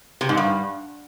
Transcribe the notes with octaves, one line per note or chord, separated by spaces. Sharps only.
C3
G#2
G2